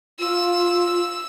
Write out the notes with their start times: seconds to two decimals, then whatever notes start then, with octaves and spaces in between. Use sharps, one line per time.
0.19 F4 E6